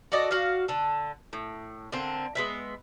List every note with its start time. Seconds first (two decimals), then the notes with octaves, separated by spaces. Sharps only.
0.12 F#4 A4 D5 D#5
0.31 F#4 F5
0.68 D3 A4
1.33 A2
1.92 D3 A#3 C4
2.35 G#3 B3 E5